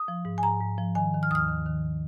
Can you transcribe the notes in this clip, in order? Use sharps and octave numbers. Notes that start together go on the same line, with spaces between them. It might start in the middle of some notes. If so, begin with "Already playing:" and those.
Already playing: D#6
F3
G#2
G#5
G#2 A#5
G#2
F3
D#3 G#5
D#3
F6
D#2 D#6 F6
D#3
D#3